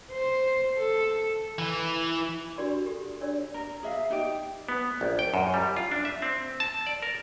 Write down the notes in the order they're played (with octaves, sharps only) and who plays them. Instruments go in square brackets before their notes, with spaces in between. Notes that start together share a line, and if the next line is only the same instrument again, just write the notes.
[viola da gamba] C5
A4
[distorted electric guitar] E3
[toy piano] D4 F#4 G4 A#4 D5 C6
G4 A4
D4 C#5 D5 E6
[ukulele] A#4
G#4 E5 F5
D#4 G4 D5
[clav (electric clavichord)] B3
A#1
G5
F#2
G3
F4
D4
E5
C4
A5
D5
A#4